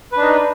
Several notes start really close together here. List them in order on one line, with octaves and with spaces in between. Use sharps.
B4 D4 D#4